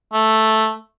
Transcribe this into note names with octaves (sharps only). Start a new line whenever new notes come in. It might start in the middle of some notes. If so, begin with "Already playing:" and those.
A3